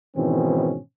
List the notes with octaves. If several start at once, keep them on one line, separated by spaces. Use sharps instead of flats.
G#2 B2 D#3 E3 C4 C#4